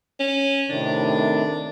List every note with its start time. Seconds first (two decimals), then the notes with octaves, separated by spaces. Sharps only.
0.20 C#4
0.69 A2 C3 D#3 D4